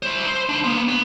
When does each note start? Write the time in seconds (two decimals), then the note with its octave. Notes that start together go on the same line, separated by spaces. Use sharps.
0.03 E4 C5
0.26 C5
0.49 D4 C6
0.64 A#3 B3
0.89 B3